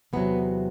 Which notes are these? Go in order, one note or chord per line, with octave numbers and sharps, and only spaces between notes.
E2 C3 F#3 B3